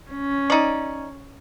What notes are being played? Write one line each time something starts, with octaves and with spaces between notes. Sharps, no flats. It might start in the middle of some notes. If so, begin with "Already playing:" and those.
C#4
D#4 D5